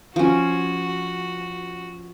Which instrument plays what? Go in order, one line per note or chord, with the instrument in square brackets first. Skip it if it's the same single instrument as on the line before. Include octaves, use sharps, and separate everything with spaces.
[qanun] F3 C#4 [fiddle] F#4